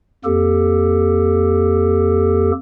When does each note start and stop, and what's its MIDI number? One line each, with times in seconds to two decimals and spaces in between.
0.25 2.52 41
0.25 2.52 58
0.25 2.52 67
0.25 2.52 69